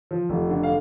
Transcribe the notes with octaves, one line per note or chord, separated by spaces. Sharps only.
F3
F1
D3
F5